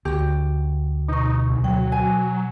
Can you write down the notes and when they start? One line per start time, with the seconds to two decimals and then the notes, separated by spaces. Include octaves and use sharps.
0.05 D2 F#4 G4
1.08 B2 D#4 C#6
1.49 C2
1.64 F#3 G5
1.92 G#5